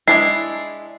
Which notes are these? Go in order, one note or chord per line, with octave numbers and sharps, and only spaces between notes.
G#3 D4 E4 C7